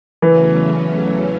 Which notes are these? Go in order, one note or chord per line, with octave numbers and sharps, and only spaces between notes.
E2 C#3 E3 F#3 A3 C#4